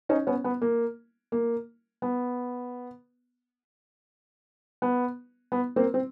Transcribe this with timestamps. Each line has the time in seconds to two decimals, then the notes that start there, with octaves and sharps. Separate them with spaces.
0.09 C#4 D#4
0.27 B3 C#4
0.44 B3
0.62 A#3
1.32 A#3
2.02 B3
4.82 B3
5.52 B3
5.76 A#3 C4
5.94 C4